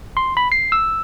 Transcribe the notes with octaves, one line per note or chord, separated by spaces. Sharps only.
C6
B5
C7
E6